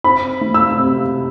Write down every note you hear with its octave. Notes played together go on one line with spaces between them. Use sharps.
C4 B5
A3
E6
C3